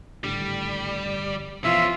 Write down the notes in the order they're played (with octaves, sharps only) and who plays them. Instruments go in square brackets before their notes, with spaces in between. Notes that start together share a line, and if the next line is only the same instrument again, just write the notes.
[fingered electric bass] G#1 A2 D3 [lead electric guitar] G3
[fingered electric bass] G1
[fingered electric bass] F1 B2 E3 [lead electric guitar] F3 C#4 [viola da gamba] F4 [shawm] E5